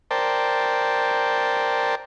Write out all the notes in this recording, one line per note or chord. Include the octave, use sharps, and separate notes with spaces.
A#4 C5 D5 G5 A5